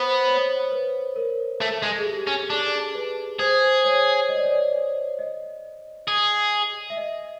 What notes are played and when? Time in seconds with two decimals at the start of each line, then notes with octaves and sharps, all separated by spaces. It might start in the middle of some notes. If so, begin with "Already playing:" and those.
Already playing: B3 C5
0.27 C#5
0.72 B4
1.16 A#4
1.61 A3 A4
1.82 G#3
1.99 G#4
2.06 G4
2.27 C#4
2.50 D4 G#4
2.95 B4
3.39 G#4 C5
3.84 C#5
4.29 D#5
4.36 D5
4.44 C#5
4.51 D5
5.19 D#5
6.08 G#4
6.90 E5
6.97 D#5